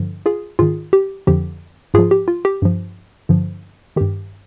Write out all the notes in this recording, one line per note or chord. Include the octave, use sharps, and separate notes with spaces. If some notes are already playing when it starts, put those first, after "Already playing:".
Already playing: G2 D3 F3
F4 G#4
G#2 D#3 F4 G#4
G4
F2 D3 F3 G4
G#2 F3 F4 G#4
G4
F4
G4
G2 F3
G2 D3 F3
G2 D#3 G4